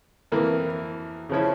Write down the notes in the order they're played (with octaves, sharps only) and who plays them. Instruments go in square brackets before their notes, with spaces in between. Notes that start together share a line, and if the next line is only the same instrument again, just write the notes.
[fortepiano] F2 E3 A#3
C#3 F3 C#4 E4